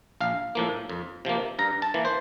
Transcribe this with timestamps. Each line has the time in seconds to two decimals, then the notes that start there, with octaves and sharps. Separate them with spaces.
0.21 A#1 F5
0.55 A2 F3 A#3
0.89 F2
1.25 C3 F3 A#3
1.59 G2 A#5
1.82 A5
1.94 E3 A#3
2.05 C5